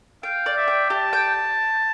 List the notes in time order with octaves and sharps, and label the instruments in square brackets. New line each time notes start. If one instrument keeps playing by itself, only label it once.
[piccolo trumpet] F5 [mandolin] G5
[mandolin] D5
[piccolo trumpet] E5
[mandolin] G5
[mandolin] G4 [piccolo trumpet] A5
[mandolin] G5